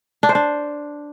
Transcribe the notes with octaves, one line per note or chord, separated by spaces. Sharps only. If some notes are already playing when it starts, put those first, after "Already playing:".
D4
C5
D4